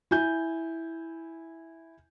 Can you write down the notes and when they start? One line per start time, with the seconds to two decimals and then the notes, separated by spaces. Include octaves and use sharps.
0.11 E4 G#5 G6